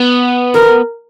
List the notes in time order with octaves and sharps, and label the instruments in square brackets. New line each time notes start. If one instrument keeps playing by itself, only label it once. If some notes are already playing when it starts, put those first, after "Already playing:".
Already playing: [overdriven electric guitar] B3
[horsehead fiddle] A#4